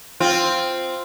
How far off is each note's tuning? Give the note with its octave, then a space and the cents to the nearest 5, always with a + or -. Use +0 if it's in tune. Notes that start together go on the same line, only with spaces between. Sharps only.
C4 +0 F4 +0